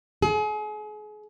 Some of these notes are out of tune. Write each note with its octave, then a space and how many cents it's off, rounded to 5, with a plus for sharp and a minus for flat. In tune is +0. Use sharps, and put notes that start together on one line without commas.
G#4 +35